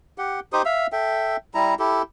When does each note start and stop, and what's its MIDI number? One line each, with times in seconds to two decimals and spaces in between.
0.18 0.40 67
0.18 0.40 78
0.53 0.62 63
0.53 0.62 67
0.53 0.62 72
0.53 0.62 87
0.65 0.87 76
0.65 0.87 77
0.65 0.87 88
0.92 1.37 69
0.92 1.37 76
0.92 1.37 79
1.54 1.74 55
1.54 1.74 64
1.54 1.74 82
1.79 2.02 64
1.79 2.02 67
1.79 2.02 69